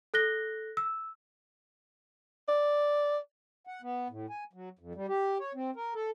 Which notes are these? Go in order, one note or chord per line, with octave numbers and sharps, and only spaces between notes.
A4 F#6 A#6 G7
E6
D5
F#5
B3
A2
G#5
F#3
F2
G3
G4
C#5
C4
A#4
A4